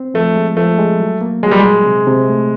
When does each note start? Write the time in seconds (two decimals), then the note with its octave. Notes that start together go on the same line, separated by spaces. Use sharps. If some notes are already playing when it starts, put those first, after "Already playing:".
Already playing: C4
0.14 F3 A3
0.36 G#3
0.57 F3 A3
0.79 G#3
1.00 F#3
1.21 A#3
1.43 F#3 G#3
1.51 G3
1.59 G#3
1.64 A#2
1.86 C3
2.07 C3
2.29 A3